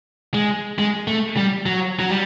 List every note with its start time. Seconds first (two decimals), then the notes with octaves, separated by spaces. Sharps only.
0.34 G#3
0.79 G#3
1.08 A3
1.37 G3
1.66 F#3
2.00 F#3
2.10 G3